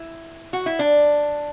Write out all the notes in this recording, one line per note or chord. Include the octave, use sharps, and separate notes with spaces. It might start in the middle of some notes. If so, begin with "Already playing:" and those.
Already playing: E4
F#4
E4
D4